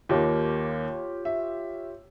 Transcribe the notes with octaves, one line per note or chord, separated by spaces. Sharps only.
D#2 A#3 F4 G4 C#5
E5